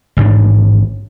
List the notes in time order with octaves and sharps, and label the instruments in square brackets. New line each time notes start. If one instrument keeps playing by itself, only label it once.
[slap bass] A1 G#2 D4